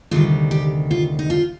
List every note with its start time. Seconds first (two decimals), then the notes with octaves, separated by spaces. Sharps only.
0.11 D2 C3 D#3 G3 F4
0.51 G4
0.91 F4
1.19 D#4
1.30 F4